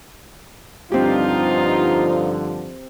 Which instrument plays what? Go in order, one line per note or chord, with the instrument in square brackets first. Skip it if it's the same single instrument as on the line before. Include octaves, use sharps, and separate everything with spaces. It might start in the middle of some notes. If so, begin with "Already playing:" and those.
[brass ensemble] G2 D3 F3 [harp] C4 G4 [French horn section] D#4 F4